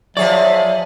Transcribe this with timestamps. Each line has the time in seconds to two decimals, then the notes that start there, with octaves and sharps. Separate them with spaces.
0.17 F3 F#3 G#4 C#5 D5 E5